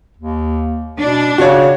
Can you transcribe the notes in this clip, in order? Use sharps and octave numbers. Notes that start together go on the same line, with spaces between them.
D#2
B2 D4
C#3 F#4 C#5